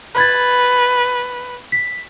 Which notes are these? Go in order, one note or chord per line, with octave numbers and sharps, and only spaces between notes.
B4 B5 G#6 A6
B6